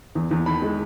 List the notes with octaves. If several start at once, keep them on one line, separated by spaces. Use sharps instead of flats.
E2
E2
D#3 B5
G#3